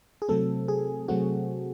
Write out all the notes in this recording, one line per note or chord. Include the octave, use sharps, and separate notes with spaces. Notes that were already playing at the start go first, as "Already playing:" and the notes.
G#4
C3 F#3 A3 C4 A4
G#4
C3 F#3 A3 C4 F#4